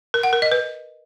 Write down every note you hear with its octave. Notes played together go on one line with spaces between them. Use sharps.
A#4
F#5
A#4
D#5
B4